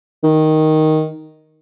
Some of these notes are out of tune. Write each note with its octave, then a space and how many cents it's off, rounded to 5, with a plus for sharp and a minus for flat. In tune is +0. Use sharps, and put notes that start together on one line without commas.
D#3 +5